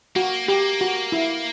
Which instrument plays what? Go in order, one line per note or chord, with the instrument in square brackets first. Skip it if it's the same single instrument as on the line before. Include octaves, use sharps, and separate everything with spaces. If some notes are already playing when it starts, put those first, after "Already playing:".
[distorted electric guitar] A#3 [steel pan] F#4
[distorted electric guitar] A#3 [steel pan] G4
[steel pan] F#4
E4